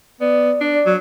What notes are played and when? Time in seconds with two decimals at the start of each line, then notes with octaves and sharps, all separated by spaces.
0.21 B3 D5
0.61 D4
0.74 D5
0.86 F#3